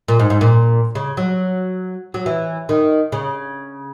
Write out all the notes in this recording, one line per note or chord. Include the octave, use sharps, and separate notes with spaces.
A#2
G#2
G#2
A#2
C#3
F#3
F#3
E3
D#3
C#3